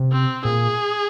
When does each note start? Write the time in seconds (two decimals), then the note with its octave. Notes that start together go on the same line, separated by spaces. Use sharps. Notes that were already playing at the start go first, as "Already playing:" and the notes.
Already playing: C3
0.12 C4
0.45 A#2 G#4